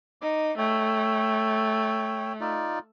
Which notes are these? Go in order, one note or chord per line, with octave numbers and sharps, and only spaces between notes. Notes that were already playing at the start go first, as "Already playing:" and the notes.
D#4 D6
A3 C#5 G5
D#4 F4 D5